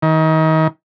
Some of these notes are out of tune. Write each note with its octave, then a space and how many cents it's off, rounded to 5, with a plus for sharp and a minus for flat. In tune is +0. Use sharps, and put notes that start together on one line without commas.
D#3 +30